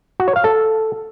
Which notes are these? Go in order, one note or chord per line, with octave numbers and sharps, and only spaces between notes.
F#4
C#5
F5
A4